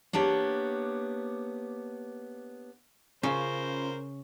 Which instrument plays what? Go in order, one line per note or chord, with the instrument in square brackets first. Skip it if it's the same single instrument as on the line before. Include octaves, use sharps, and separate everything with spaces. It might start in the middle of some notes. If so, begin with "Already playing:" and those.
[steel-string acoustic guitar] A#3 B3 D4 G4 C#5
[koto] C#3 [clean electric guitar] C#4 F4 [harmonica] A#4 C5